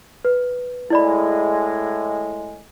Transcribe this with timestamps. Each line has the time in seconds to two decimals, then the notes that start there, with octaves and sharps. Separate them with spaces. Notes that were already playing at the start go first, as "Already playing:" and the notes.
0.25 B4
0.90 A2 G#3 E4 D5 B5